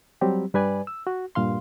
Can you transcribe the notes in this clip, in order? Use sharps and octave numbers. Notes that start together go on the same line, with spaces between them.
F#3 G3 C4 G4
G2 G3 B4 D5 G#5
E6
F#4
G2 A#2 F5 C6